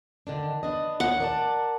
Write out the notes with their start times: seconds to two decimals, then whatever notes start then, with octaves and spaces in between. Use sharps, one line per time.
0.27 D3 D#3 D4
0.63 B3 D4 D#5
1.00 D#2 C#5 F#5
1.20 A#4 D5 A5